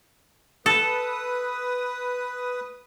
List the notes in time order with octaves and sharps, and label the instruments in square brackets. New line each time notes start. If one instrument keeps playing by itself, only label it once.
[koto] A4 [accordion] B4 D#6